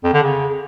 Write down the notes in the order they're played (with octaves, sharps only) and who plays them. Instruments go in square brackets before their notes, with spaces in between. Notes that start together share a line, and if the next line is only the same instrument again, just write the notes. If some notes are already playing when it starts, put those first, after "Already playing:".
[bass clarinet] F2
D3
C#3